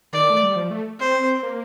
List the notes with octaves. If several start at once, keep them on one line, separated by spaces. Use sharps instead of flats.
D#3 D5
A3
G3
F3
A3
C4 C5
A#3